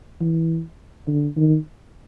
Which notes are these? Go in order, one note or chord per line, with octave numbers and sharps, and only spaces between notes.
E3
D3
D#3